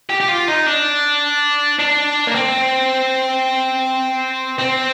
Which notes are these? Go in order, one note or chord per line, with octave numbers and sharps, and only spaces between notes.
G4
G4
F4
D#4
D4
D4
A#3
C4
C4